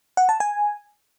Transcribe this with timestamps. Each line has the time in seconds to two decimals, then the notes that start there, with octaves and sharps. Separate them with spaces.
0.17 F#5
0.29 A5
0.40 G#5